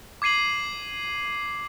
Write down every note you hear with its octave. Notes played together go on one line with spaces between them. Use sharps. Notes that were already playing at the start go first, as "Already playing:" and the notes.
D6 G#6 C7 D#7 F#7